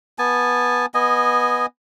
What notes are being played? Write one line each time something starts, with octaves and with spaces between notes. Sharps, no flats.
B3 G#5 A5
B3 D#5 G#5